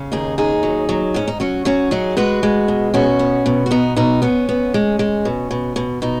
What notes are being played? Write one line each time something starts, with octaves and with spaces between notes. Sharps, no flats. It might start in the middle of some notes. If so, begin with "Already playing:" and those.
Already playing: C#3
D#2 D#4 G#4
D#2 D#4 G#4
F#3
F#3
G#2 C#4
D#4
F#3 C#4 F#4
F#3 C#4 F#4
F#3 D#4 G#4
G#3 F#4 B4
G#3
B2
B2 C#4 F#4
B3
B2
F#4
B3 D#4
B2 D#4
B3 C#4
B3
G#3
G#3
B2
B2
B2
B2 D#4